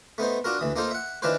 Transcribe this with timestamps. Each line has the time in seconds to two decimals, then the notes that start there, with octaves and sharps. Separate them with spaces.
0.18 A3 B3 D#4 C5
0.44 D4 F4 F#4 A#4
0.59 D2 E3 D#6
0.76 A#3 D#4 F4 A4 C5
0.91 E5 F#5
1.22 D#3 E3 D4 F4 B4 C5